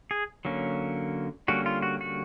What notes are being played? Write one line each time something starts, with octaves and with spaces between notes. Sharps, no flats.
G#4
D3 F#3 A#3 C#4
D3 G3 A#3 C#4 F#4
F4
F#4
F#4